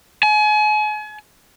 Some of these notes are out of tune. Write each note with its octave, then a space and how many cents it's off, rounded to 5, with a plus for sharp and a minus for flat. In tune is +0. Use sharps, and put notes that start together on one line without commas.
G#5 +35